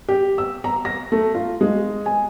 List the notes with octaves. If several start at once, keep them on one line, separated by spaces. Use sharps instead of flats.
G4
E6
A#5
A#6
A3
F4
G#3
G#5